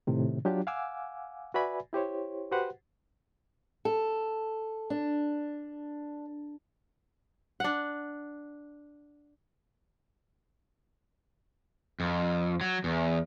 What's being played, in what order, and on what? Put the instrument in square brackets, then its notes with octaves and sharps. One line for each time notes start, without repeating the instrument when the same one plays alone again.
[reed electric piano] A2 C3 D#3
F#3 D4 F4 G4
F5 F#5 G#5 D6 E6
F#4 B4 D5 E5 G#5 B5
E4 G4 C5 C#5
F#4 G4 B4 C5 F#5
[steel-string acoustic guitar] A4
D4
[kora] D4 F#5
[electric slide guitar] F2
F#3
E2